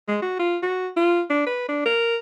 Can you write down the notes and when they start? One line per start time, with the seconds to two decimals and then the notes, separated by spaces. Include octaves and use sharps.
0.08 G#3
0.22 F#4
0.39 F4
0.63 F#4
0.97 F4
1.30 D4
1.46 B4
1.68 D4
1.85 A#4